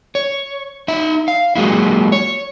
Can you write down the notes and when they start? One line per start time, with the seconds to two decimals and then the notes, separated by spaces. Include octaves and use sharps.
0.15 C#5
0.88 D#4 E5
1.28 F5
1.56 F#3 G#3 A#3 E4
2.12 C#5